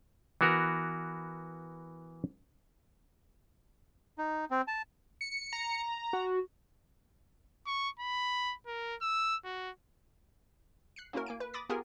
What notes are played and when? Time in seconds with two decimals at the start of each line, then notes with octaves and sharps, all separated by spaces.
0.41 E3 B3 F#4 A#4
4.18 D#4
4.51 C4
4.68 A5
5.21 C#7
5.53 A#5
6.13 F#4
7.67 C#6
7.99 B5
8.67 A#4
9.01 E6
9.44 F#4
10.96 F#6 C7 C#7
11.13 A#3 C#4 E4 F#4 A#4
11.26 A#3 G#5 D7
11.40 B4
11.54 B5 D6 D#6 A6 A#6
11.69 B3 F4 G4 G#4 A#4 G#5